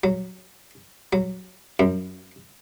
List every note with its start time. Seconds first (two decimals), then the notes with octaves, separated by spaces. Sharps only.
0.04 F#3
1.13 F#3
1.80 F#2